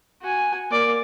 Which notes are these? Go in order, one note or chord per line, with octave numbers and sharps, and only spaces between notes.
F#4 G#5
A#3 D5